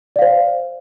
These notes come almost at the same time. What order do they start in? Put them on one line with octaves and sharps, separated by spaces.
D5 F5 C5